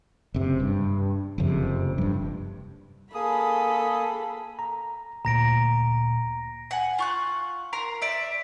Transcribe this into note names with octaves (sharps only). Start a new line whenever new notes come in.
F#1 C3
G2
F#1 F2 C3
F1 G2
A#3 G#4 A4 B5 D#6
A#5
D2 A#2 A#5 A#6 D7
F#5 G#5
F4 C#6 F#6
A#4 A#5 C6
D5 E5